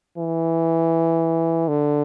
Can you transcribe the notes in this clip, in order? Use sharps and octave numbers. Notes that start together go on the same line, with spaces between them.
E3
D3